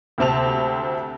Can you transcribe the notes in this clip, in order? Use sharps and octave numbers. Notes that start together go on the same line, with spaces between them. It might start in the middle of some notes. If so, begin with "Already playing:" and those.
D2 C3 C4 A5 F7